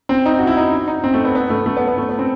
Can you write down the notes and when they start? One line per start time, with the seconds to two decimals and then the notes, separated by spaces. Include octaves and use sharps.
0.09 C4
0.25 D#4
0.38 F#4
0.47 E4
0.57 D#4
0.88 D#4
1.04 C4
1.14 A3
1.25 B3
1.35 B3
1.50 A3
1.66 A3
1.77 B3
1.87 B3
1.98 A3
2.09 B3
2.19 C4